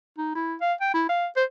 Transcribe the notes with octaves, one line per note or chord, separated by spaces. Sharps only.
D#4
E4
F5
G5
E4
F5
C5